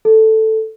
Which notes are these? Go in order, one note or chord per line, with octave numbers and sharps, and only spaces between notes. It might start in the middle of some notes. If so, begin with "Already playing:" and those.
A4